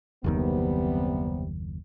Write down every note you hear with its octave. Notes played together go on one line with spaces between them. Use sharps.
F#1 D#2 C3 D#3 G3 B3